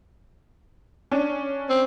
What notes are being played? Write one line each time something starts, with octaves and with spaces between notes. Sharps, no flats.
C#4 D4
C4